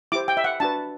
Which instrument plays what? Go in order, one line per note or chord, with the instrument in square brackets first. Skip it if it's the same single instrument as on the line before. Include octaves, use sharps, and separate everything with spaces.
[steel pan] E4 G4 C5 D6
G5
E5
F#5
D4 F#4 B4 A5